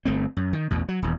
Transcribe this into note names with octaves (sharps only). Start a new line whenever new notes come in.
G1 A3 C4
F#2
D#3
A1 E2 B2
F#3
D#1 E2